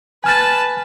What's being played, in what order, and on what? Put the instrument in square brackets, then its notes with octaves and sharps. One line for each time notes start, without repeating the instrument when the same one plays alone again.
[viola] B4 A5 [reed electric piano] G#5 F6 A6